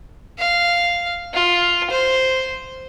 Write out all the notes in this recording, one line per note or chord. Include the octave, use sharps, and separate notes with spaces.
F5
F4
C5